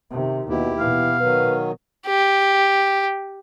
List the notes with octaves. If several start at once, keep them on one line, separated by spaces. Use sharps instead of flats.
C3 D#3
D#2 B2 E4 G4
B2 E3 F5
D#3 F#3 B4
G4